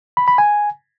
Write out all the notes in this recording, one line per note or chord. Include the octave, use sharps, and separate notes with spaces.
B5
B5
G#5